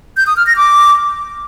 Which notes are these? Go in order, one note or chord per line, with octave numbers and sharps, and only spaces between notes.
G6
D#6
F6
A#6
D6